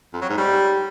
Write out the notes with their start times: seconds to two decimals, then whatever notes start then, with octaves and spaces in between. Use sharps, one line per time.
0.13 F2
0.21 F#3
0.29 G#2
0.37 G3